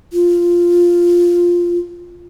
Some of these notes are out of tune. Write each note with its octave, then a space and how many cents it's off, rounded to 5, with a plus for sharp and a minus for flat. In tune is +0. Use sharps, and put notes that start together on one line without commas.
F4 +0